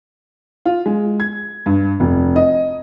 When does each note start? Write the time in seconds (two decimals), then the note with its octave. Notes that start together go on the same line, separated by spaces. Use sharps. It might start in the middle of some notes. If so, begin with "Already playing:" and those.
0.66 F4
0.86 G#3
1.20 G#6
1.66 G2
2.00 F1
2.36 D#5